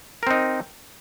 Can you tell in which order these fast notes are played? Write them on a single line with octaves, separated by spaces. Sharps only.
A#4 C4 D#4